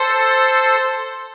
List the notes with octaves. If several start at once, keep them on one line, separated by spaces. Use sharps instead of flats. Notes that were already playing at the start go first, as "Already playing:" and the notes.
Already playing: A4 C5